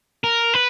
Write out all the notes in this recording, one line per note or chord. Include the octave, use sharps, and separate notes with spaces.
A#4
B4